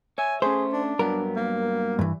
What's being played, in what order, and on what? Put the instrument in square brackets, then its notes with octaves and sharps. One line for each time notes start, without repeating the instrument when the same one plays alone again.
[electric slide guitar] C#5 E5 [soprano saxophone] G#5
[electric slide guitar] A3 C#4 [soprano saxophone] G#4 [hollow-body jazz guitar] C5
[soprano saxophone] D4
[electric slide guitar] G2 F#3 B3 [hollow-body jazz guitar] A#4
[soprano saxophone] A#3
[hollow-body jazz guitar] G2 E3